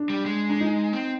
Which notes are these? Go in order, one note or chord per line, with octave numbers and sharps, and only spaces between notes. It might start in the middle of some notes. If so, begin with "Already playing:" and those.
Already playing: D4
G3
G#3
D4
D#4
C4